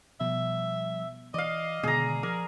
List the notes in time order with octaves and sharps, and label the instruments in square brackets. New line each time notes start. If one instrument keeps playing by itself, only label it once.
[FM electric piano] B2 [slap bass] F3 G3 [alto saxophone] E5
[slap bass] E3 [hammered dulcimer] D5 F5 [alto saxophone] D#5
[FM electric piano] B2 [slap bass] D3 D#3 G#3 [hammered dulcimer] G#4 A#5
[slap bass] F3 [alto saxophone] G#4 [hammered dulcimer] A#4 [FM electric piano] D6 F6